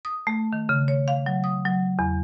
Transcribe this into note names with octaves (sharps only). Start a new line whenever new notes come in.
D#6
A3
D#3
C#3
C#5
F5
F#3
D#6
F#3
E2